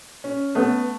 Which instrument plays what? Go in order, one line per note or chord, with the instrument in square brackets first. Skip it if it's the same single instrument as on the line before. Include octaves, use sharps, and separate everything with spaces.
[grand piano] C#4
[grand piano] A3 [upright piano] B3